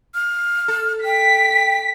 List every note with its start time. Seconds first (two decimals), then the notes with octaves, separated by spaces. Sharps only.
0.15 F6
0.68 A4
1.05 G5 B6